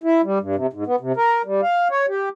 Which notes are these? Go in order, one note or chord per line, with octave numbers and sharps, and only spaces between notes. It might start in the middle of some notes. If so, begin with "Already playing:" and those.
E4
G3
G2
C3
G#2
B3
C3
A#4
G3
F5
C#5
G4